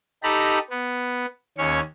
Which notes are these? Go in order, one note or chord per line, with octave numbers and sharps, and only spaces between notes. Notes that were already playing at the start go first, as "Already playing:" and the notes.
D#4 G4 A4 A#5 B5
B3
D#2 C#4 C#5